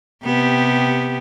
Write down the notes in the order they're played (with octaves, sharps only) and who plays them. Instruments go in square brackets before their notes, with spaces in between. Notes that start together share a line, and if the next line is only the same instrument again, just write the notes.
[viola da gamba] C3 B3 G4